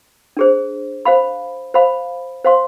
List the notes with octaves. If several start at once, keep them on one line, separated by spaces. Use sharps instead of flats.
D4 G#4 C5
C5 F5 B5
C5 F5 B5
C5 F5 C6